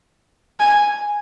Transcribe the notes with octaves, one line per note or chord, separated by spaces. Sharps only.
G#5